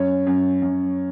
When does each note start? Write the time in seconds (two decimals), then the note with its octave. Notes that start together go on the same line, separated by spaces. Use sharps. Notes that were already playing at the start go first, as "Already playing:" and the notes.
Already playing: F#2 C#5
0.27 F#2
0.62 F#2